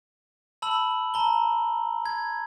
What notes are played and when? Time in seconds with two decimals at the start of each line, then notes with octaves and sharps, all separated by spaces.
0.62 A5 B5 E6 F#7
1.14 A5 A#5 G7
2.06 G#6